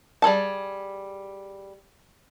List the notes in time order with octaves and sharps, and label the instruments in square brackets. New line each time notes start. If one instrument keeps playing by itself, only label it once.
[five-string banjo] G3 G#4 A4 A5